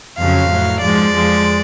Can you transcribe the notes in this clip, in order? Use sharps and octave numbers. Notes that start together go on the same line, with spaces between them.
F2 C#3 F#3 F5
A2 F#3
G#2 F3 G#3 D5
F2 F3 G#3